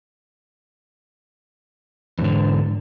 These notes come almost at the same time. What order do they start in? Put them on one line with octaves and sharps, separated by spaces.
E2 G#2 D3